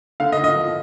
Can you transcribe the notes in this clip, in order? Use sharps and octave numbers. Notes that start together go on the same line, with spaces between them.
D3 F5
D#5
D3
D#5
F3